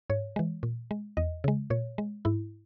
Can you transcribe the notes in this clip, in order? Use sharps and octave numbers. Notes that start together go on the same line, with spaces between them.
G#2 C#5
E3 G#3
A#2
G#3
E2 D#5
C#3 G#3
A#2 C#5
G#3
G#2 E4